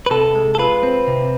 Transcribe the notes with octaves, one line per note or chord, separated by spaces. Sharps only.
B4
C3 A4
G#3
A4
F4 B4
C4
C3